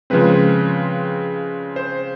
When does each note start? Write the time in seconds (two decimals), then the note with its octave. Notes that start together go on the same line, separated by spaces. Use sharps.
0.10 C#3 F3 G#3 C4 B4
1.76 C5